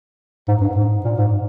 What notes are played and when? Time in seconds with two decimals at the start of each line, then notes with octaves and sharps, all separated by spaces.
0.48 G#2
0.61 G2
0.77 G#2
1.05 A#2
1.18 G#2